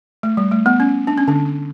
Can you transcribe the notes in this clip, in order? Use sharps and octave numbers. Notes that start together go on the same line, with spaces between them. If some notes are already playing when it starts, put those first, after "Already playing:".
A3
G3
A3
B3
C#4
D4
C#4
D3 D4